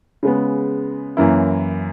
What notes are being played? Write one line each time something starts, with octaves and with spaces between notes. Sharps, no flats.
C#3 G#3 B3
F#2 E3 A#3 C#4 E4